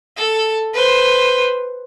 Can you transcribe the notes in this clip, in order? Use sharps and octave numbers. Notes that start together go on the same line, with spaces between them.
A4
B4 C5